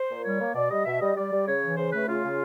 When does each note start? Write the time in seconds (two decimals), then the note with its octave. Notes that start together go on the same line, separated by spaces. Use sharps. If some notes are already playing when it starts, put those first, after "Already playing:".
Already playing: C5
0.08 A#2
0.24 G3 C#5
0.39 A#3
0.54 B2 D5
0.70 G3 D#5
0.85 B2 E5
1.00 G3 D#5
1.16 G3 D5
1.31 G3
1.46 C#3 C#5
1.62 E3
1.77 C#3 C5
1.92 A3 B4
2.07 C#3 F4
2.23 C#3